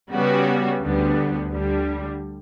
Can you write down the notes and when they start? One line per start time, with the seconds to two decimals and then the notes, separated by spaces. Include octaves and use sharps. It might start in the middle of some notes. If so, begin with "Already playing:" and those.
0.12 C#3 G3 B3 F#4
0.81 D2 D3 G3 B3
1.49 D2 D3 G3